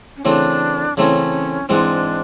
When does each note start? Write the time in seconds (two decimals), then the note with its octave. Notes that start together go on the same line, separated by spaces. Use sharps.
0.17 C#4
0.25 C#3 E3 A3 C4 D4
0.97 C#3 E3 A3 C4 C#4
1.69 G#2 E3 G#3 C4 D4